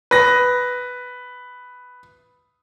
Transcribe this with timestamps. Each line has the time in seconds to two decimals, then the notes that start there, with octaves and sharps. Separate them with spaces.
0.11 B4 A#6